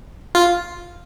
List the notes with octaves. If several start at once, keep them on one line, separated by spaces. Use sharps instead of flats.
F4